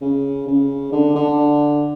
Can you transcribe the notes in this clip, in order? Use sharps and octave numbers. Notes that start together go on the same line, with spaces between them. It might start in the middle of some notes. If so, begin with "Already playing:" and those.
C#3
C#3
D3
D3